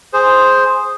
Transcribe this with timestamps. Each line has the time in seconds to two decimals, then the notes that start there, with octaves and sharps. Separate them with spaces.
0.13 G#4 C5